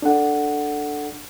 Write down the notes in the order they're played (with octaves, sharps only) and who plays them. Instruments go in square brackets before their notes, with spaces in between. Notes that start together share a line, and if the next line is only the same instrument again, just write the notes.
[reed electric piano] D4 A4 F#5